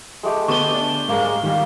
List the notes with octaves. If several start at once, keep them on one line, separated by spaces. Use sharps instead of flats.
G#3 A3 G4
D3 B3 G4 A5 C#6 D#7 G7
D4
G#2 G#3 A#3 F5
D#3 G3